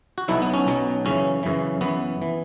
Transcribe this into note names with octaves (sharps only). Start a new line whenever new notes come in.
F#4
B1 B2 F#3 E4
B3
C#4
B1 B2 F#3
F#2 C#3 E3 C#4
F#2 C#3 E3
F#2 E3 B3
E3